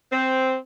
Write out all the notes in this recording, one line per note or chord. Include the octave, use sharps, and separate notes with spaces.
C4